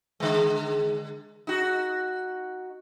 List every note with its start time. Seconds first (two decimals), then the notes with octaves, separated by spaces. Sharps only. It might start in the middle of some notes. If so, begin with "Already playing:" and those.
0.20 D3 G#3
1.47 D#4 F#4